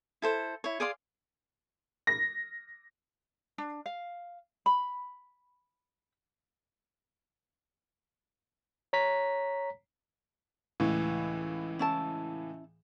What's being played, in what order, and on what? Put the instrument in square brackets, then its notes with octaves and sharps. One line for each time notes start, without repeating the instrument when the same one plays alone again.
[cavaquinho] E4 A4 C5
E4 C#5
G#4 D5 F5 C6
[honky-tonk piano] A#6
[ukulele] D4
F5
B5
[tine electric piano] C#5 A#5 B6
[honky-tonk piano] C#2 A2 [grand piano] E3
[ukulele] C#4 E4 A5